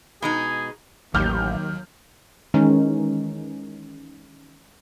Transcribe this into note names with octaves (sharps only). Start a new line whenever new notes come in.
B2 G#3 D#4 G#4
A1 D#2 F#3 D6 F6 G6
D#3 E3 G#3 C#4 D#4